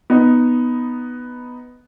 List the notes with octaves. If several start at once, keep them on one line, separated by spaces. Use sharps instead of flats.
B3 D#4